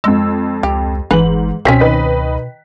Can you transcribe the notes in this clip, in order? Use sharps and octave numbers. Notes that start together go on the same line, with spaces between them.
F2 G#3 E6
C#2 G4
G1 G#2 E3 B4 F#7
C#2 B2 C4 C#4 G5 B6
D#3 B4 D#5